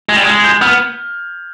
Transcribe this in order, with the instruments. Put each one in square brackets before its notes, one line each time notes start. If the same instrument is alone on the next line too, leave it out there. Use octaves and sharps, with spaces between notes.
[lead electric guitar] G#3 [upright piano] G#6
[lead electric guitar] G3
[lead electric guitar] G#3 [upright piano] G#6
[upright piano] G6
[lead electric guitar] B3 [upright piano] F6